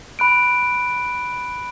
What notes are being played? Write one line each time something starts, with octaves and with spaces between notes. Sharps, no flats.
B5 F#6 D7